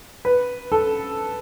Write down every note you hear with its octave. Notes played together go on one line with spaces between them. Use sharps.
B4
A4